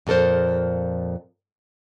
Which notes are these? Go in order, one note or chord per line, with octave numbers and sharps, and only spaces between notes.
F2 A#2 A4 A#4 C5